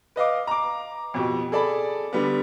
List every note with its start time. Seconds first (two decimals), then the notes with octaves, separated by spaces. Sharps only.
0.16 B4 D#5 F5 D6
0.47 A#5 D6
1.14 F2 B2 G4
1.52 G#4 A4 D5 A5 B5
2.13 D3 G3 B3